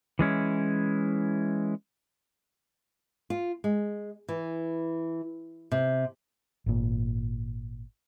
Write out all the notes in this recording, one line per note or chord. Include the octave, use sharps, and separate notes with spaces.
E3 G#3 C#4 E4
F4
G#3
E3
C3
G#1 A#2